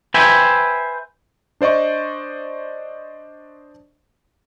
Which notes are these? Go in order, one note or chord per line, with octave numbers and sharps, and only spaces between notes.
B4 C5 E5 G5 G#5
D4 C5 D5 D#5 C#6